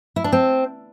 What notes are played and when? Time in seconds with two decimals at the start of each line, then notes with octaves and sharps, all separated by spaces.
0.16 E4
0.24 D4
0.32 C4